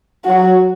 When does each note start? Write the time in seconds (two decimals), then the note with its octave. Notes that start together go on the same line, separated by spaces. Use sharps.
0.25 F#3 F#4